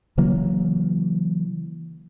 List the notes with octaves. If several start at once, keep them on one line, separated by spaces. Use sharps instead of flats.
C#3 E3 F#3 A#3